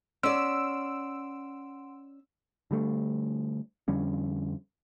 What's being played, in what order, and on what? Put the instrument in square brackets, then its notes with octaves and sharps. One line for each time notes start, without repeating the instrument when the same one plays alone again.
[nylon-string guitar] C#4 D5 [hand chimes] F#5 C6 D7 [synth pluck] E6
[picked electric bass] D3 G3 A3
F2 D3 G3 C#4